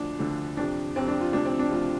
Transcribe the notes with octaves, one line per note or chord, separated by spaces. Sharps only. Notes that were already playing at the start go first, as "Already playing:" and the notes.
Already playing: D2 D3 F3 D4
D2 D3 F3
F2 C3 F3 D4
F2 C3 F3 C4
D4
F4
D2 C3 F3 D4
C4
D4
D2 C3 F3 F4